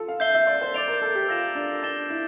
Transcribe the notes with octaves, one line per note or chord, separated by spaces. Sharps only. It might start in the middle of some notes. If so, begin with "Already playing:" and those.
Already playing: F4 A4
F5
E5 G6 C7 G7
E5
D5
C5
D5 D6 A6 D7 F7
A#4
A4
G4
F4 E6 A#6 E7
D4
D4 A6 E7 G7
E4